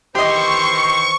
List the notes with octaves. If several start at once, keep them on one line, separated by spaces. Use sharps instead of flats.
D#3 E3 G4 C5 D#5 C6 C#6